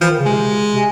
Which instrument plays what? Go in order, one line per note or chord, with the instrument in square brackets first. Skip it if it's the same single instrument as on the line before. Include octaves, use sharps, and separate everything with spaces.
[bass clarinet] E3 [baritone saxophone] F3
[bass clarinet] D#3
C#3
[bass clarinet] C3 [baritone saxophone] G#3
[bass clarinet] C3
C3